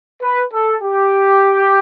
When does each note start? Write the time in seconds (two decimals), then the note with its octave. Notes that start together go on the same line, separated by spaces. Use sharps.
0.22 B4
0.53 A4
0.82 G4